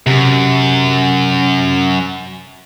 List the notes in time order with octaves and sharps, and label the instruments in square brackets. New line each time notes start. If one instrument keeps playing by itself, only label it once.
[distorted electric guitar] F#2 [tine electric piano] C3